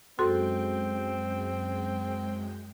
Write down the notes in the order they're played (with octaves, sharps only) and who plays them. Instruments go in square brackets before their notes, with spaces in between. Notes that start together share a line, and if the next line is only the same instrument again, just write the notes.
[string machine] F#2 G#3 G5 [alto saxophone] C4 [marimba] F#4 A4 C6